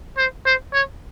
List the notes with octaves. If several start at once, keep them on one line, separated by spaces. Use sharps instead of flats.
C5
C5
C#5